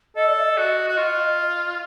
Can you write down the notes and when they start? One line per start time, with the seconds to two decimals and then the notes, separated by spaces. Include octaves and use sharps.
0.16 A4 D#5
0.28 D5
0.39 E5
0.43 D#5
0.57 F#4
0.87 F#4
0.98 F4